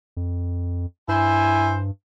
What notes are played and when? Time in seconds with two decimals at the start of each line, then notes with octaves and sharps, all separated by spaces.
0.17 F2
1.08 G2 E4 C5 G#5